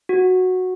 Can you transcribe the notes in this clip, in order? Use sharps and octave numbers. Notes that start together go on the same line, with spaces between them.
F#4